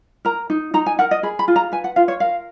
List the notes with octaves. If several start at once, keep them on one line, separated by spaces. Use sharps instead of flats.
A#4 A#5
D#4
D#4 A#5
G#5
A#4 F#5
D#5
G#4 B5
B5
F4
A#5
B4 G#5
F#5
F4 F5
C#5
A#4 F5